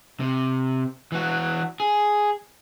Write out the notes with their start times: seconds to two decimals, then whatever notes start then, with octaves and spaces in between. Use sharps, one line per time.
0.20 C3
1.12 E3 F#4
1.80 G#4